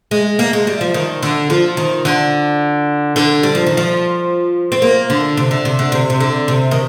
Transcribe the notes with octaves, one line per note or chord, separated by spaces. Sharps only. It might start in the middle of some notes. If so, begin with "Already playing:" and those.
G#3
A#3
G#3
G3
F3
D#3
D3
F3
D#3
D3
D3
G3
F3
D#3
F3
C4
A#3
D3
C3
D3
C3
D3
C3
C3
D3
C3
D#3